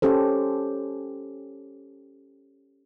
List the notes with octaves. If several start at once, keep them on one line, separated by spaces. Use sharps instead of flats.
C#4 G4 A4 C5